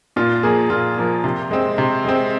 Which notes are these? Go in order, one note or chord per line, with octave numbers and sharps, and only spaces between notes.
A#2 F4
F3 A#3 G#4
A#2 F4
F3 A#3
C3
G#3 C4
C3
G#3 C4